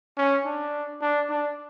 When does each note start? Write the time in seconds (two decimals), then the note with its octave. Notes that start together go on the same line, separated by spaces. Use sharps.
0.17 C#4
0.45 D4
1.01 D4
1.30 D4